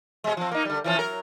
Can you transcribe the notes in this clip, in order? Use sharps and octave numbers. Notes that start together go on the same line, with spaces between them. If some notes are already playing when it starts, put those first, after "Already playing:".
B2 G#3
F3 C4
A#3 D#4
D3 G3
E3 F3 C#4
F#3 A#4